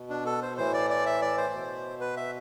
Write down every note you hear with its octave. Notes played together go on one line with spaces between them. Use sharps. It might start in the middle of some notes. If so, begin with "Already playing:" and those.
Already playing: B2
D4
A4
C5
A2 E3 C5
D5
D5
E5
D5
C5
B2
B4
E5